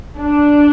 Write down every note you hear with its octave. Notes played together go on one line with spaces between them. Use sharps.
D4